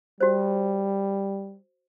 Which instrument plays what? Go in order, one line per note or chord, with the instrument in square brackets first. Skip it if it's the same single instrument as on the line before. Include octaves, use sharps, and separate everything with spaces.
[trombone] G3 [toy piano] F#4 C5